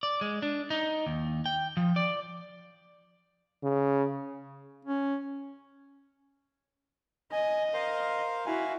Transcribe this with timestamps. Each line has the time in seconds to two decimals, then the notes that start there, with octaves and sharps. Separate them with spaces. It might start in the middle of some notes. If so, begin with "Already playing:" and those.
0.03 D5
0.21 G#3
0.42 D4
0.70 D#4
1.06 D#2
1.46 G5
1.77 F3
1.96 D5
3.63 C#3
4.85 C#4
7.32 D#5 G#5
7.74 A#4 C5 F5
8.46 E4 F#4 F5 G#5